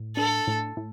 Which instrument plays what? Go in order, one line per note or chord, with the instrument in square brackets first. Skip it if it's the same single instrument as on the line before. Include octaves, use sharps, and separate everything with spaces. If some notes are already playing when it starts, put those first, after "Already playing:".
Already playing: [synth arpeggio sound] A2
[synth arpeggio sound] D4 [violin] A4
[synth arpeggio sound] A2
A2